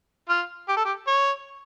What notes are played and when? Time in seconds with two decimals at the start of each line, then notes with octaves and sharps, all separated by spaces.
0.29 F4
0.68 G4
0.77 A4
0.85 G4
1.07 C#5